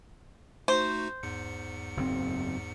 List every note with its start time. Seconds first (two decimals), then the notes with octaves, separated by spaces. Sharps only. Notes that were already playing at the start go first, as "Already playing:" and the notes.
0.68 A3 D#4 F#4 C5
1.23 E2 G#2 C#7
1.97 F#1 A2 C4